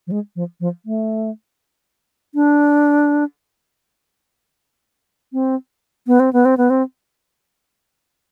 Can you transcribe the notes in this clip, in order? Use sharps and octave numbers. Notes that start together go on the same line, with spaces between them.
F3
G#3
F3
F3
A3
D4
C4
B3
C4
B3
C4
B3
C4